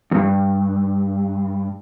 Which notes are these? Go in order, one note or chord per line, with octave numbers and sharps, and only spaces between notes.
E2 G2